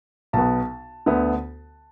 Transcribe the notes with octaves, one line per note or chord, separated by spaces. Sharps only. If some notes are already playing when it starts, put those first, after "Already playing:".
B1 B2 B3 A5
D2 D3 B3